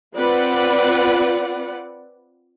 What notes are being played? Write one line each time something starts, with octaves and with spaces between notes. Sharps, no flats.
C4 F4 B4 D5 F#5